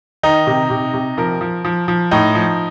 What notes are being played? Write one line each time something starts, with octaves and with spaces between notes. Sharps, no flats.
D#3 D#4
C3
C3
C3
F3 A#4
F3
F3
F3
A2 D#4
F3